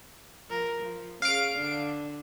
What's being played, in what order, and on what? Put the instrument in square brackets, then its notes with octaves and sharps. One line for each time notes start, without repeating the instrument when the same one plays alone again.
[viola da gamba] F3 A#4
F3
[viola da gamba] C#4 G#4 [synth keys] F5 D7
[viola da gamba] D3 D4